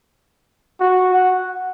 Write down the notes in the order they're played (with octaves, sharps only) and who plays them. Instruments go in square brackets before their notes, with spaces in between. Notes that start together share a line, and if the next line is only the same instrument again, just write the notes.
[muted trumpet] F#4
F#5